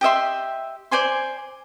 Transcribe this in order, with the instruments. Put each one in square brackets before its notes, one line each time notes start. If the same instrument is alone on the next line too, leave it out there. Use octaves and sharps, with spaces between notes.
[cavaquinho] G4 D#5 E5 C6
C5 D5 G#5 C6